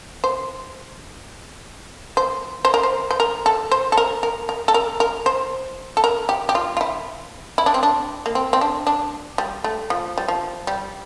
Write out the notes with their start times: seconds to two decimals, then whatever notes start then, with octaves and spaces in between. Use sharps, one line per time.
0.24 C5
2.17 C5
2.65 C5
2.74 A#4
2.83 C5
3.11 C5
3.20 A#4
3.46 A4
3.72 C5
3.92 A4
3.97 A#4
4.23 A#4
4.49 A#4
4.68 A4
4.74 A#4
5.00 A#4
5.26 C5
5.97 A4
6.04 A#4
6.29 G4
6.49 G4
6.55 F4
6.77 F4
6.81 E4
7.58 E4
7.66 D4
7.74 C4
7.83 D4
8.26 A#3
8.35 C4
8.53 C4
8.61 D4
8.87 D4
9.38 G3
9.64 A3
9.90 F3
10.18 G3
10.28 F3
10.67 G3